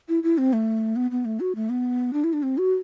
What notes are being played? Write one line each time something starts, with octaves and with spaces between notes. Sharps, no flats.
E4
E4
C4
A3
B3
B3
A3
F#4
A3
B3
D4
E4
D4
C4
F#4